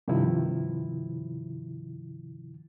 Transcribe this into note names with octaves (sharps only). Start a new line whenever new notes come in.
G2 C3 D#3 F3 E4